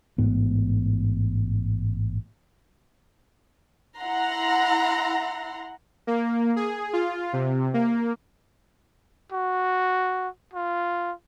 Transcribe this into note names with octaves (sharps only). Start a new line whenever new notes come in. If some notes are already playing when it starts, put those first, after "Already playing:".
A1 G#2 B3
E4 F#5 A#5 C6
A#3
G#4
F4
C3
A#3
F#4
F4